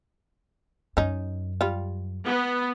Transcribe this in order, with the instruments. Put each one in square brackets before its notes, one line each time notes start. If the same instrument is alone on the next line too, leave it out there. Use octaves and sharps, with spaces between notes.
[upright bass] F#2 [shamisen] C#4 D#4
[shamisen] G3 F4
[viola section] B3